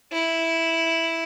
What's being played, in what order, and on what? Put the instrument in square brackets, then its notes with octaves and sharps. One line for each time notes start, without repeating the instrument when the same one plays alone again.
[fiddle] E4